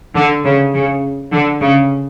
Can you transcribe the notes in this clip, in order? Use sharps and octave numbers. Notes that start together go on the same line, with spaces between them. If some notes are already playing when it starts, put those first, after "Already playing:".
D3
C#3
C#3
D3
C#3